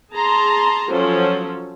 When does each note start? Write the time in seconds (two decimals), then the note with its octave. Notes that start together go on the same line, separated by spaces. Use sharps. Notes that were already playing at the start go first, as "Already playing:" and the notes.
0.12 G#4 A5 A#5 C6
0.90 F3 F#3 C#4 A4 C5